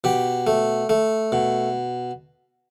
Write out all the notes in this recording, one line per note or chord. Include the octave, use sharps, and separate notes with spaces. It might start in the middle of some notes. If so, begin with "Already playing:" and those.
B2 G4
A3
A3
B2